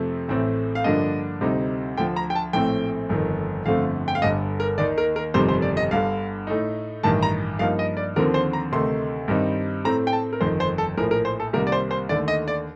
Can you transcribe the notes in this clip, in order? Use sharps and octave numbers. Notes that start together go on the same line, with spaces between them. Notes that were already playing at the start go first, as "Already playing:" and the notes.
Already playing: F2 C3 F3 A3 C4
A1 A2 A3 C4
F5
G2 D3 F3 A#3 D4 D#5
D2 C3 G3 C4 D#4
D2 D3 F3 G5
A#5
G5
A5
A#1 A2 A3 C4 G5
G1 F2 D#3
G1 F2 D3 A3 C4 F5
G5
F5
G1 G2 D3 D#5
A#4
D#2 D#3 A#3 D#4 D5
A#4
A#4
G1 F2 C3 D#3 G3 C5
C5
D5
D#5
G1 G2 D3 F5
A2 A3 D#4
A1 G2 D#3 A5
A#5
G2 F3 A#3 D#4 F5
D#5
D5
D#2 D3 F3 C4 A#4
C5
A#5
D2 C3 D#3 A3 D#4 C6
G2 D#3 G3 C4 D#4
A2 A3 C4 A#5
G5
A5
A#4
G1 F2 D#3 C5
C5
A4
A#1 A2 F3 A#4
A#4
C5
A4
C2 C3 D#3 G3 A#3 A#4
D5
C5
C5
D#2 D3 A3 D5
D#5
D5